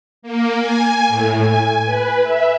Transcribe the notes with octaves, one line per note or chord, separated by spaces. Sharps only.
A#3
G#5
A2
G#5
B4
E5